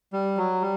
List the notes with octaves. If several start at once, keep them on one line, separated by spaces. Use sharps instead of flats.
G3
F#3
G3